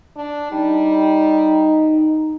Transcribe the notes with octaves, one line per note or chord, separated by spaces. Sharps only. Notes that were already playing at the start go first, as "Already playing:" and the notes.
D4
G3 D#4